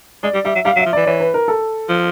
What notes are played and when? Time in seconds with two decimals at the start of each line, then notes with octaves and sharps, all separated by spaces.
0.23 G#3 D5
0.34 G3
0.45 G3 E5
0.55 F#3
0.65 G3 F5
0.76 F#3
0.79 E5
0.86 F3
0.93 E3 D5
1.06 E3 C#5
1.20 B4
1.34 A#4
1.48 A4
1.89 F3